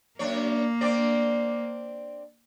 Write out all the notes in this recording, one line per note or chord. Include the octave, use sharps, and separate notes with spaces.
F#2 A#3 D4 C#5
C4 D4 D5